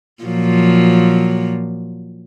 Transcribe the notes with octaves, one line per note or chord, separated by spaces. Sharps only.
A#2 F3 F#3